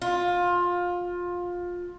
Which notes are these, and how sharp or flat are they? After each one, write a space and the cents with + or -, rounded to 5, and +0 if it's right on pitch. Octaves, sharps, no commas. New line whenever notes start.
F4 +20